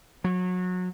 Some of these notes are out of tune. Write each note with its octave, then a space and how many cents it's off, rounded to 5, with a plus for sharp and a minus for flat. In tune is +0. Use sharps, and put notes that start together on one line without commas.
F#3 -25